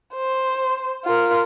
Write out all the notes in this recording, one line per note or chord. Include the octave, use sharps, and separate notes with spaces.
C5
F4 A#4